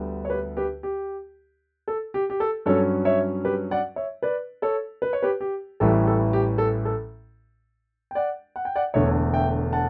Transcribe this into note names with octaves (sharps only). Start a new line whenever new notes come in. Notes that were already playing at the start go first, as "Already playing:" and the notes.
Already playing: D2 D3 G3 B3
C#5
G4 B4
G4 B4
G4
A4
G4
G4
A4
G2 F#3 C#4 A4 C#5
C#5 E5
G4 B4
D5 F#5
C#5 E5
B4 D5
A4 C#5
B4
C#5
G4 B4
G4
A1 A2 E3 G3 A4
A4
G4
A4
A4
G5
D5 F#5
F#5
G5
D5 F#5
E1 E2 D3 A3 C#5 E5
E5 G5
F#5 A5